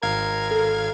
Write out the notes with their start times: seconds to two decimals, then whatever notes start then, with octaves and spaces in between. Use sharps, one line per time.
0.03 G#1 A#4 F5 G#6
0.51 A4